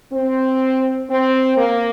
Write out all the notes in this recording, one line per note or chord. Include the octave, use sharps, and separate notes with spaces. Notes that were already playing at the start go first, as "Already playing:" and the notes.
C4
C4
A#3